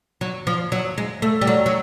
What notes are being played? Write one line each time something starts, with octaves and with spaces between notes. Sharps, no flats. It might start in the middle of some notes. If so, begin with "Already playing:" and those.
F#3
F3
F#3
G#3
A3
G3
F#3
F#3